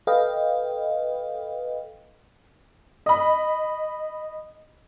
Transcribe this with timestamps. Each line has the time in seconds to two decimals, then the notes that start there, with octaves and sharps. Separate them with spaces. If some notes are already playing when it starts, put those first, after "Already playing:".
0.07 A4 B4 D#5 F5 G5
3.06 D#5 B5